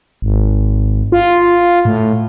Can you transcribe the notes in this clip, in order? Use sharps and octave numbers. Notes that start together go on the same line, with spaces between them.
G#1
F4
A2